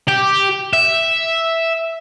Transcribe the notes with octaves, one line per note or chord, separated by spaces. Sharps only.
G4
E5